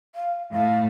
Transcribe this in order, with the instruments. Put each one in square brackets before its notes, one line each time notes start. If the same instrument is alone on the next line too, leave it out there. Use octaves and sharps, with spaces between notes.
[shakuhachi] F5
[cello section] A2 A3 [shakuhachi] F5